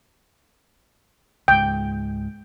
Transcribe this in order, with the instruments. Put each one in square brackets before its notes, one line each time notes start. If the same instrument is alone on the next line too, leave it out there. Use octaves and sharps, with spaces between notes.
[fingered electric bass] C#2 G#2 [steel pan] G5